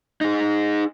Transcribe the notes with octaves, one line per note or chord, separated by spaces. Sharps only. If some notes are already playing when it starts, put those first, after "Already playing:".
D#4 G#4